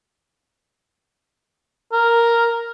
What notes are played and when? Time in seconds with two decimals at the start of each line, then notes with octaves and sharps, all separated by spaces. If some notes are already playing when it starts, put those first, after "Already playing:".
1.92 A#4